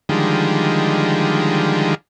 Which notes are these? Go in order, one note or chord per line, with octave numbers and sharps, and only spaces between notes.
D3 D#3 F3 G3 G#3